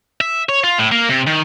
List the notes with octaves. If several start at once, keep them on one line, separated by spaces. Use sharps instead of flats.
E5
C#5
F4
A2
A#3
C3
D#3